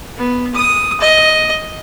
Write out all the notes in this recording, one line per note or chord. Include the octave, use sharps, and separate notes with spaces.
B3
D#6
D#5